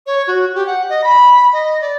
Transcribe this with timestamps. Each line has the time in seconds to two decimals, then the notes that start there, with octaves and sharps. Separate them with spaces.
0.06 C#5
0.27 F#4
0.55 G4
0.66 F#5
0.89 D#5
1.04 B5
1.53 D#5
1.81 D5